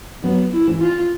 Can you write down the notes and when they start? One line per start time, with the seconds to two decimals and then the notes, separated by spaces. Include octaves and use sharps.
0.23 F#3 B3
0.53 E4
0.67 E3
0.82 F4